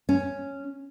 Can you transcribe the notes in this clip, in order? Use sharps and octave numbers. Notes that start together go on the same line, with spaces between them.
C#4